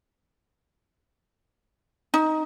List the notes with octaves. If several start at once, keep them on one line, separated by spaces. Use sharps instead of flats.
D#4